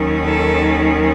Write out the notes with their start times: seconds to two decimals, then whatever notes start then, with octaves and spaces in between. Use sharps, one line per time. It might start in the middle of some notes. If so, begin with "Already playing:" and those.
Already playing: D#2 D#3 F#3 C#4
0.22 A4